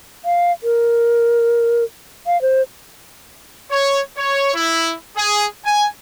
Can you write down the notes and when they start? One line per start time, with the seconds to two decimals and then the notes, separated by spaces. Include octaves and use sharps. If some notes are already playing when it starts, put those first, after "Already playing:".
0.25 F5
0.63 A#4
2.27 F5
2.42 C5
3.70 C#5
4.17 C#5
4.54 E4
5.16 G#4
5.64 G#5